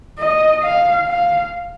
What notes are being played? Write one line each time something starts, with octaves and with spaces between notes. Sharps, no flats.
D#5
F5
F5